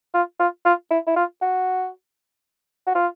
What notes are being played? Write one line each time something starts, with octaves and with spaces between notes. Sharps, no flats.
F4
F4
F4
E4
E4
F4
F#4
F#4
F4